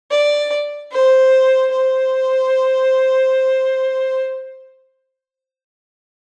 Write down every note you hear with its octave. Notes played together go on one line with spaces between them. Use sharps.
D5
C5
C5